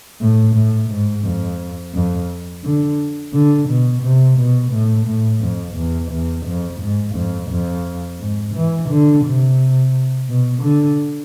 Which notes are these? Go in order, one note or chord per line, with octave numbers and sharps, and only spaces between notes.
A2
A2
G#2
F2
F2
D3
D3
B2
C3
B2
A2
A2
F2
E2
E2
F2
G#2
F2
F2
G#2
E3
D3
C3
B2
D3